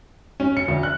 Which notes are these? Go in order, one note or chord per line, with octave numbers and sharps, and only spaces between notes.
C#4
C#7
D2
F#6